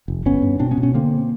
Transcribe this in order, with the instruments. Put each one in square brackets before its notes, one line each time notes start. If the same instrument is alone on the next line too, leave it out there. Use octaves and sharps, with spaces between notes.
[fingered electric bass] F1
G1 B3 C#4
G2
B2 C4 D4
B3 C#4
B2
B3 C#4
D3 A#3 C4